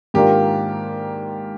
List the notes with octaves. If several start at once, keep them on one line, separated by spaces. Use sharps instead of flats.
G#2 D#3 A#3 D4 F4 G4